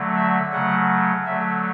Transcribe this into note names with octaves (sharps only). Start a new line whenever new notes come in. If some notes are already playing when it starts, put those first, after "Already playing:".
Already playing: D3 F#3 A3
E5
C#3 F#3 A3 F#5
D3 F#3 A3 E5